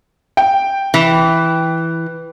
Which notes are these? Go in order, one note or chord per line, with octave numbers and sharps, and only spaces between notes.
G5
E3